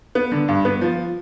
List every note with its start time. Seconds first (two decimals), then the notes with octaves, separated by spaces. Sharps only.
0.15 B3
0.32 D3
0.48 G2
0.65 B3
0.81 F3